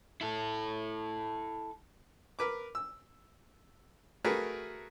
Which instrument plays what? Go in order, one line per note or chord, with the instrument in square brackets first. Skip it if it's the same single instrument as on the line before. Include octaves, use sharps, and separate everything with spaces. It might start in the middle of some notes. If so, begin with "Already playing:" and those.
[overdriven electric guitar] E4 A4
[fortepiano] A#4 B4 D6
E6
A3 F#4 G#4 A#4 B4